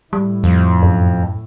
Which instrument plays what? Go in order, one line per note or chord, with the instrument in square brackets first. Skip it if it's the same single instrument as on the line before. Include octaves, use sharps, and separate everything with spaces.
[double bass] A2 [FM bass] G3
[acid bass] F2
[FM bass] F#2